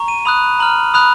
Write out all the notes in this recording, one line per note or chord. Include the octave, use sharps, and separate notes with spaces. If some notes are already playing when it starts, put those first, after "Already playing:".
Already playing: A#5 C#6
D#7
B5 D#6 F#6 F7
A#5 F6 F#7
B5 D#6 F#6 F7